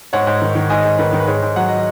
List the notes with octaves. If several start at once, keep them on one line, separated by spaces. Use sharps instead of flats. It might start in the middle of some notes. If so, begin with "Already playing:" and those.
G#2 C#5 F#5
G#2
D#3
D#3
G#2 D#5 G#5
G#2
D#3 B4
D#3
B4
G#2 G#4 C#5
G#2
F#3 F#5
D#5